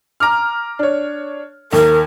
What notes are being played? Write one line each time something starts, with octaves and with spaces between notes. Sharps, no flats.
A#5 D6 F6
D4 C#5
D#2 A#4